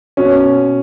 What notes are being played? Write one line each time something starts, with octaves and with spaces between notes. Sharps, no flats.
B2 C#4